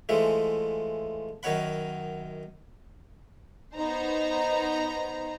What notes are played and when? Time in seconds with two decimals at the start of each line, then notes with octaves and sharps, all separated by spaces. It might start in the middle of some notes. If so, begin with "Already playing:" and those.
0.09 E3 F3 G#3 A3
1.43 F#2 D#3 D#4 C#5 F#5 B5
3.74 B3 D#4 C5 A#5